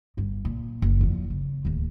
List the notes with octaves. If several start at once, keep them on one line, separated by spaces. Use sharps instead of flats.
G1 G2
A#2
F#1
E2 F3
C#3
D1 D#2